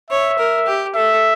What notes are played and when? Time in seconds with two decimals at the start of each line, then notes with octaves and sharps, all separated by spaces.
0.10 C#5 E5
0.39 A#4
0.67 G4
0.95 A4 E5